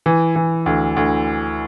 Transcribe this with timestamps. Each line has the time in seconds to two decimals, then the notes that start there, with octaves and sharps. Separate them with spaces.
0.06 E3
0.36 E3
0.66 D2
0.96 D2